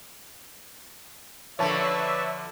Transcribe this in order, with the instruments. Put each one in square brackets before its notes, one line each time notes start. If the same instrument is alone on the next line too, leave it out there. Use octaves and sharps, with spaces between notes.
[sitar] D3 F3 [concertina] B4 D5 [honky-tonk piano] C#5 A5 [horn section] E5